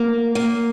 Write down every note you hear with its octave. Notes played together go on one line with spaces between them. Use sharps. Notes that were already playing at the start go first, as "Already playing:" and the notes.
Already playing: A#3
A#3